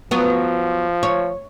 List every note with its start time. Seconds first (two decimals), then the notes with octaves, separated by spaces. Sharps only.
0.11 F3 F#3 B3
1.03 C#5